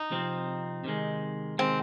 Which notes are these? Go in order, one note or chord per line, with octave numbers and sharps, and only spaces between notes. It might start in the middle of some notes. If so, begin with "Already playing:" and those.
Already playing: D#4
C3 F3 C4
C3 D#3 G#3
C3 D#3 G#3 C4